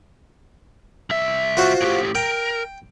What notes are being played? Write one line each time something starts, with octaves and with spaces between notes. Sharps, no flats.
C2 E5
F4 F#4 C5
A2 G4
A#4 G5